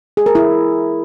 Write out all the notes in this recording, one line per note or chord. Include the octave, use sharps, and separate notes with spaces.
G#4
A#4
E4